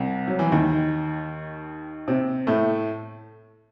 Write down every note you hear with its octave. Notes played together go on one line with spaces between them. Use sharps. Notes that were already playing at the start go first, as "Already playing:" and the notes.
Already playing: C2 C3
F#3
E3
D#2 D#3
C3 C4
A2 A3